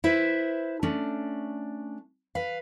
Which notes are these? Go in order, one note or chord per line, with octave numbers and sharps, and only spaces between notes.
E4 B4 C5 E5
A3 C#4 D4
B4 F5